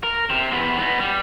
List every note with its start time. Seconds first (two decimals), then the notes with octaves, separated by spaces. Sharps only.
0.03 A#4
0.30 C3
0.51 E2 B3
0.78 B3 D#4
1.00 G3